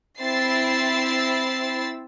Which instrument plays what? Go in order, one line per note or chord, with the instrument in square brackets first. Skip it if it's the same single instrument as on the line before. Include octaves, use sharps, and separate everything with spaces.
[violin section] C4 E4 E6 A6 C7